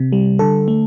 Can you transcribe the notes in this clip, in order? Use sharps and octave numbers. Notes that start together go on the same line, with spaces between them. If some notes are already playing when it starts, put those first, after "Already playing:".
Already playing: C3
G3
D3 A4
A3